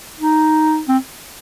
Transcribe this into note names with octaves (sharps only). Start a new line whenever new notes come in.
D#4
C4